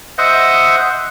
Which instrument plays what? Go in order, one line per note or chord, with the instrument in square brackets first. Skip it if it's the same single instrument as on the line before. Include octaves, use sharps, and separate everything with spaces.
[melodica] C5 D#5 E5 F#5